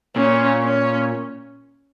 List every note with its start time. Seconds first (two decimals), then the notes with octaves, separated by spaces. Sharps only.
0.16 A#2 C#4
0.63 C#4